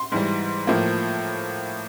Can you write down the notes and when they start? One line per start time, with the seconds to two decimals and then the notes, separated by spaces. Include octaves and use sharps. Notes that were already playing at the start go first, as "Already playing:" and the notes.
Already playing: C6
0.12 G#2 E3 G3
0.67 A2 F3 A#3